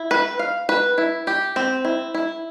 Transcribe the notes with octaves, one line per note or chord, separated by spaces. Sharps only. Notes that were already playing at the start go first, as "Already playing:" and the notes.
Already playing: E4
B4
F5
B4
E4
G4
C4
E4
E4